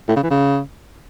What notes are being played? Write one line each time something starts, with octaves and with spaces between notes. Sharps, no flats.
A2
C#3
E3
C#3